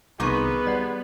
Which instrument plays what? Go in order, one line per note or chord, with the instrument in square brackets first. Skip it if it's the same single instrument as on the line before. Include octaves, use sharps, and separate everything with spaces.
[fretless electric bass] C2 D#3 [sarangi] B3 [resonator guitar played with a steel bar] D#4 F4 G#4 [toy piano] C#6 D6
[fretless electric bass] G3 [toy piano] D5 F#5